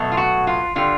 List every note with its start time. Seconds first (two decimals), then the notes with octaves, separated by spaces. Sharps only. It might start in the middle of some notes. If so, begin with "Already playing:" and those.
Already playing: B2 F#3 A3
0.12 F4
0.17 F#4
0.47 F4
0.76 D3 G3 F4